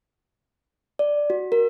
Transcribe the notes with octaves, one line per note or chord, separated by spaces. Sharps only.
D5
F#4
A#4